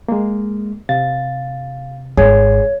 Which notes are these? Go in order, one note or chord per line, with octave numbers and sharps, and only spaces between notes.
G#3 A#3
C3 F5 A6
G#1 G#4 C#5 G#6